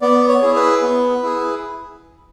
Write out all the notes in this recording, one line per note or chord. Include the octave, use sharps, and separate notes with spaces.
B3 D5
C#5
E4 G#4
B4
B3
E4 G#4